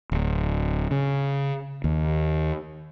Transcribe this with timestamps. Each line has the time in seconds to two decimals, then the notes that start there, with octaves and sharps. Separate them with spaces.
0.12 D1
0.91 C#3
1.84 D#2